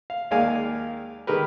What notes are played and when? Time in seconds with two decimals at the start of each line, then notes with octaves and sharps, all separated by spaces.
0.10 F5
0.31 D#2 G#3 A#3 D5 F5 G#5
1.27 D#3 G#3 G4 A#4 B4